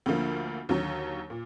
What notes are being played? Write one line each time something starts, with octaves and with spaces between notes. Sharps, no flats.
D2 D3 F3 A#3
D#2 D3 F#3
A#2